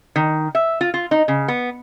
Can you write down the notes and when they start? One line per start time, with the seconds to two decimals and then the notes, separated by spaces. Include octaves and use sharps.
0.16 D#3
0.55 E5
0.81 F4
0.94 F4
1.11 D#4
1.28 C#3
1.48 B3